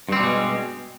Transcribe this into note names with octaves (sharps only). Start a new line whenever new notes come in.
G2 B2 G3 G#3 C4